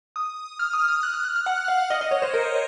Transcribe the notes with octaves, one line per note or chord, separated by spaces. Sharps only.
D#6
F6
D#6
F6
F#6
F6
F#6
F6
F#5
F5
D#5
D#5
C#5
C5
A#4